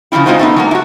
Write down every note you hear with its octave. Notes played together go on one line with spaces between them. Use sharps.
C#3 F3 C4 C#4 E4
G#3 C4 D#4 F4 F#4 C5
A3 B3 D#4
F#3 G#3 A#3
E4 F#4